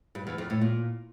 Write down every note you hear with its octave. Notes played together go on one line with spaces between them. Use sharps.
G2
E2
F2
A2
A#2